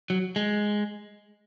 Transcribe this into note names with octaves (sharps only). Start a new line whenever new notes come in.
F#3
G#3